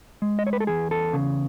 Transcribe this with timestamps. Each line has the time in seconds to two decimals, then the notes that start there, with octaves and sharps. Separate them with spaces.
0.22 G#3
0.39 D#5
0.47 C#5
0.53 B4
0.60 A4
0.67 E2 G#4
0.91 A4
1.13 C#3